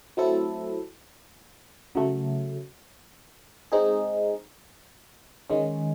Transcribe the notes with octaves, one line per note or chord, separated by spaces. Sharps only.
F#3 A3 C4 E4 A4
C#3 F#3 A3
G#3 C4 D#4 G#4
D#3 G#3 C#4